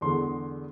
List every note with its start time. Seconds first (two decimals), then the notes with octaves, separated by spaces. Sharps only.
0.01 E2 D3 G#3 C6